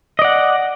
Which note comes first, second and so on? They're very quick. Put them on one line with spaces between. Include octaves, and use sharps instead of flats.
D#5 D5 F#5